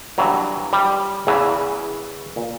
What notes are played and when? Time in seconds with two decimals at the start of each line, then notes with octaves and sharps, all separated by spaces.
0.18 G2 E3 F#3
0.73 G3
1.27 E2 C#3 E3
2.36 A#2